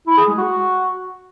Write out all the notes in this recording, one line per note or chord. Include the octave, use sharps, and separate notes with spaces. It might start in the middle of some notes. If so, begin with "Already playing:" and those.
E4
G#4
G#3
F#4